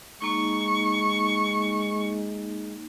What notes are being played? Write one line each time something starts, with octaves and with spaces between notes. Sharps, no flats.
G#3 A#3 D#4 C#6